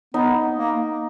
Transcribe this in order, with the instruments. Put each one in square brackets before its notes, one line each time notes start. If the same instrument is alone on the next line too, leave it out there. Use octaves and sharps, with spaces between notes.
[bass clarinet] B3 [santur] D#4
[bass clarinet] A#3